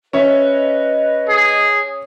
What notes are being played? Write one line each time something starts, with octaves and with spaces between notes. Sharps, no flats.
C#4 B4 C#5 D#5 E5
G#4